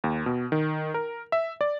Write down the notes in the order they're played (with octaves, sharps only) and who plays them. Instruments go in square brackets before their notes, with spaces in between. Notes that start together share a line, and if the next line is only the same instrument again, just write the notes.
[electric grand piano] D#2
B2
D#3
A#4
E5
D5